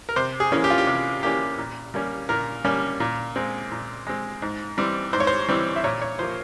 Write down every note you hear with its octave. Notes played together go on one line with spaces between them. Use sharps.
A#4
C3 C5
G#4
E3 A#3 C#4
G4
F4
G4
C3
E3 A#3 C#4 G4
A#2
G3 A#3 C#4
A#2 A#4
G3 A#3 C#4
A#2
G#3 C4
A#2
G#3 C4
G#2
E3 G3 C4
G#2 C5
C#5
C5
E3 G3 C4
E5
A#2 C#5
C#5
F3 A#3 C5